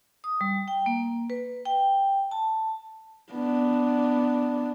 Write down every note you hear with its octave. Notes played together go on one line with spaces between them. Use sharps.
D#6
G3
G5
A#3
B4
G5
A5
B3 D4